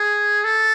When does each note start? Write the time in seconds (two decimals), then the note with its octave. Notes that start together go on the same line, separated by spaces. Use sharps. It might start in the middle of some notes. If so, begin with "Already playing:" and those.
Already playing: G#4
0.44 A4